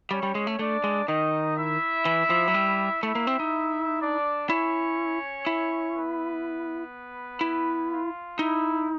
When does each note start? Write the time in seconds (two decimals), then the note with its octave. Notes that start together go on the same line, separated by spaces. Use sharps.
0.11 G3 C#4 C#5
0.23 G3
0.35 G#3
0.47 A3
0.59 A3 D4 D5
0.84 G#3
1.08 D#3 D#4 D#5
1.56 E4 E5
2.05 E3
2.30 F3
2.48 F#3
2.54 G3
3.03 A3 E4 E5
3.15 A#3
3.27 C4
3.40 D#4
4.00 D4 D5
4.49 C#4 E4 C#5
5.47 E4
5.95 B3 B4
7.41 E4
7.90 F4
8.38 D#4 E4